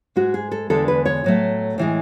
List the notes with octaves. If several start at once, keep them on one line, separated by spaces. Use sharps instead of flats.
G#2 G#3 F#4
G#4
A4
E2 D3 G#3 A4
B4
C#5
A2 F#3 A3
A2 E3 G#3